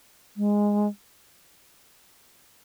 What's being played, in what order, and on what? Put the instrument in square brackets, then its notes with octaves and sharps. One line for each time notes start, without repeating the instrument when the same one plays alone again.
[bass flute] G#3